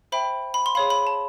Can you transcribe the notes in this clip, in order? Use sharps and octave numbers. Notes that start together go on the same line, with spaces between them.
C5 E5 G5 B5
B5
C6
G#4 C#5 F5 B5
B5
A5